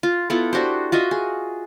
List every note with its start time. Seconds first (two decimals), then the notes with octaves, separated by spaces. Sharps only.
0.03 F4
0.30 B3 E4 F4 A4
0.53 D4 F#4 G4 C5
0.92 F4 F#4 D#5 E5
1.11 G#4